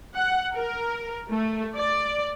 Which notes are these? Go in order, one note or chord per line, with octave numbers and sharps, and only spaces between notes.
F#5
A#4
A3
D5